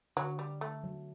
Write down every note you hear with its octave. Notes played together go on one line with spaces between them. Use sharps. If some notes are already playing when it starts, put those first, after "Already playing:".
D3 F#3
G3
A3
F#3